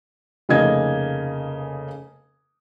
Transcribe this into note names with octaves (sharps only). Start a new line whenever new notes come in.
F1 C#3 A#3 D#4 D#5 G#6